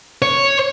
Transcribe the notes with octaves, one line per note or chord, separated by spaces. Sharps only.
C#5